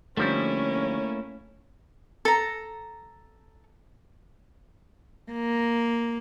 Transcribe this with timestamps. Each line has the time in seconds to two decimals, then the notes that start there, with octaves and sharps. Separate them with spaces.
0.17 D3 F3 G3 A3 A#3 C#4 E4
2.25 A4 A#5
5.31 A#3